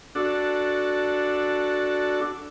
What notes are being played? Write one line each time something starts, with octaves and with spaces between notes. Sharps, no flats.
D4 F#4 A4